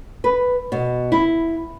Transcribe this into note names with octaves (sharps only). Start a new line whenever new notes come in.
B4
B2
E4